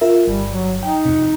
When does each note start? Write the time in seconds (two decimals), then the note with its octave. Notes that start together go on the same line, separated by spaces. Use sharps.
0.01 F4 A#4 E5
0.28 G1 G3
0.50 F#3
0.83 D#4 G5
1.05 F2 C3